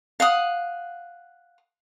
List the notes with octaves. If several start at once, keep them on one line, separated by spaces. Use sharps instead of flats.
F5 F#5 D#6